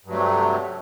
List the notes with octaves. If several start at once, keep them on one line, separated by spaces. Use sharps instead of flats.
G2 C3 F#3 A3